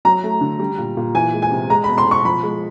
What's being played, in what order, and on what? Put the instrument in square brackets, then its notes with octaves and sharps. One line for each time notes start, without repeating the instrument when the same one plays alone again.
[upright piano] F#3 A#5
A3
D3
G3
A#2
A#2
E3 G#5
G#3
G#5
C3
G#3 A#5
B2 B5
C6
B2 C#6
F3 B5
G#3